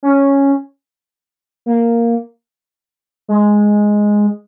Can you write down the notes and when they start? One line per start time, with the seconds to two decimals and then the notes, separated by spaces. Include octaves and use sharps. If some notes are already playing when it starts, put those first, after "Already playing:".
0.03 C#4
1.66 A#3
3.28 G#3